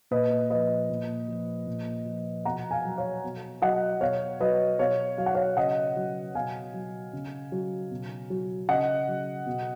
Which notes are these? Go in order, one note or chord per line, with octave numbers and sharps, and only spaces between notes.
A#2 B4 D#5
F3 B4 D#5
A#2
F3
A#2
F3
B2 F#5 A#5
F5 G#5
F#3
C#5 F5
B2
F#3 D#5 F#5
B2 C#5 F5
F#3 B4 D#5
B2 C#5 F5
F#3 F5
F#5
C#5 F5
C#3 D#5 F#5
F#3
B2 F5 G#5
F#3
C#3
F#3
B2
F#3
C#3 D#5 F#5
F#3
B2